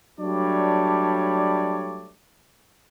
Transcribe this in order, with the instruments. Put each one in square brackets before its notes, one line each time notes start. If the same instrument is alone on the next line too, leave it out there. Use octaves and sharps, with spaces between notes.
[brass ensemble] F#3 G3 A3 D4 C#5 D5